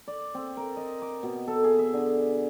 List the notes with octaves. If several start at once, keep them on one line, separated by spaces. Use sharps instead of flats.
D5
C4
A#4
D#5
D6
B2
A4
G#4
E5
D3